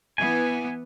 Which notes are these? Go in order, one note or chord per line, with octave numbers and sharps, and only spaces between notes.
E3 B3 G#5